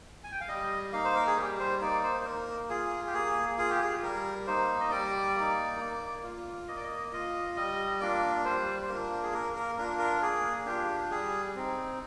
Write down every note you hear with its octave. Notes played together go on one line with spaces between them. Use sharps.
G#5
G5
F5
G3 D#5
A#3 D#4 F5
C5
A#4
G#4
G3 G4
C5
A#3 D#4 D5
C5
C5
A#3 A#4
F4 G#4
G4
A#3 G#4
F4 G#4
G4
G#4
G3 A#4
A#3 D#4 C5
D#5
G3 D5
A#3 D#4
A#3
F4
A#3 D#5
D5
D#5
F4 D#5
G3 D#5
A#3 D4 F4 D5
G3 C5
C5
A#3 D4 F4 A#4
G#4
A#3 A#4
A#4
D4 F4 A#4
A#4
A#3 G#4
D4 F4 G4
G4
G3 G#4
C4 D#4